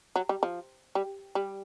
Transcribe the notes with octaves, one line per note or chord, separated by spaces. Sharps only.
F#3
G3
F3
G3
G3